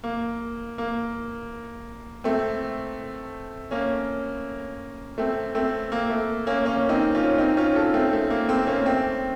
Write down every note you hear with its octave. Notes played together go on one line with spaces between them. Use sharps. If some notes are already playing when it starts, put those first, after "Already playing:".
A#3
A#3
A3 C4
A#3 C#4
A3 C4
A3 C4
A#3
A3
A#3 C#4
A#3 C#4
C4 D#4
C#4 F4
C4 D#4
C#4 F4
F4 A4
A3 C4
A3
A#3
A3 C4
A#3 C#4
A3 C4